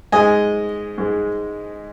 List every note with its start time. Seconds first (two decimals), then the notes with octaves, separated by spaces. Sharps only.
0.12 G#2 G#3 D#5 G#5
0.98 G#2 G#3